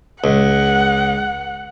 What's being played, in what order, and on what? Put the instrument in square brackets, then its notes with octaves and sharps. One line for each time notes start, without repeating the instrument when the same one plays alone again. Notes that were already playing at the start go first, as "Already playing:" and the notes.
[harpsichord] C#2 [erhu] F#5